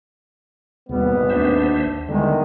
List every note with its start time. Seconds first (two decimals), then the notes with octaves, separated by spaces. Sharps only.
0.89 G#1 D#2 B2 G3 B3
1.29 D#2 D4 C5 E5
2.09 E2 D3 D#3 G3 G#3